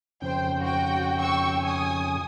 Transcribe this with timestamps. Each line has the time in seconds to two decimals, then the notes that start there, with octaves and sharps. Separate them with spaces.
0.22 F2 C#3 C5 G5
0.59 F#4 G5
1.18 G5 C#6 E6
1.62 G#5 D#6